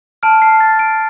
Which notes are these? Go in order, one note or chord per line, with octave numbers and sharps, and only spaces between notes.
A5 F6 D7
C7
A6
D7